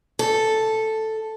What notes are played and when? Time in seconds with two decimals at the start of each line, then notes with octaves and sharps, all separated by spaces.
0.19 A4